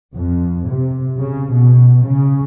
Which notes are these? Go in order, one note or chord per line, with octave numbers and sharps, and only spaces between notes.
F2
C3
C#3
B2
C#3